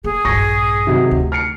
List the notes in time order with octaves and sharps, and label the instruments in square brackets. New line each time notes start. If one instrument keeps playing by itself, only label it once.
[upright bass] A#3 [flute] G#4
[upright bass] A#1 G2 [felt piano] C#6 A#6
[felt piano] C3 D#3 F#3
[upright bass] D2
[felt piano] F6 C7 C#7